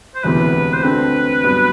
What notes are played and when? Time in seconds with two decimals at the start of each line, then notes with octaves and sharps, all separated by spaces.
0.15 C5
0.24 E1 D2 C3 E3 B3 B4
0.74 C5
0.83 D2 D3 A3 C4 B4
1.44 G2 F#3 B3